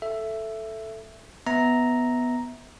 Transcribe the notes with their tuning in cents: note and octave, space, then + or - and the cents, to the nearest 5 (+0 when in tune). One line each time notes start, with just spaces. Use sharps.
A4 +0 E5 +10
B3 +0 E5 -20 A#5 +0